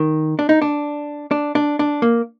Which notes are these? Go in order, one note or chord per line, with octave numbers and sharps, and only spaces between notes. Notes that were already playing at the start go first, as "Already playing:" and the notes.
Already playing: D#3
D4
D#4
D4
D4
D4
D4
A#3